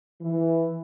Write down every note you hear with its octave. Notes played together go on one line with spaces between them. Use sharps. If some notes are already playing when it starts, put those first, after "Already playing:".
E3